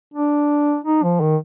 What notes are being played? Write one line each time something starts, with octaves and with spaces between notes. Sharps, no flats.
D4
D#4
F3
D#3